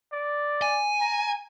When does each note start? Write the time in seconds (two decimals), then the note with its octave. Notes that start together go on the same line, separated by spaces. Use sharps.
0.13 D5
0.62 G#5
1.01 A#5